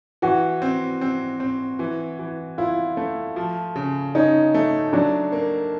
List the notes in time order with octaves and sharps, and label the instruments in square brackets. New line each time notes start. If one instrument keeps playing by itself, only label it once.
[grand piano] E3 [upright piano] F#4
[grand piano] C4
C4
C4
E3
E3
[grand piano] E4 [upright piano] F4
[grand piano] A3
F3
C#3
[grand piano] C#4 [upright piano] D#4
[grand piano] A3
[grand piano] F#3 [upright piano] D4
[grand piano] A#3